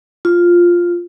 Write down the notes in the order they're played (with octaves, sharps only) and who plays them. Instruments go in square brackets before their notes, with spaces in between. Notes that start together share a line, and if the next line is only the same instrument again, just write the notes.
[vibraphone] F4